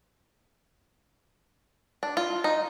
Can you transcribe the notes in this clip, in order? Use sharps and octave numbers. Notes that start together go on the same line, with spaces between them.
D4
F4
D#4